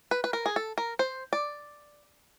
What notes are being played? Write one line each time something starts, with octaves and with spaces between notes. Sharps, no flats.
B4
B4
A#4
G#4
A4
A#4
C5
D5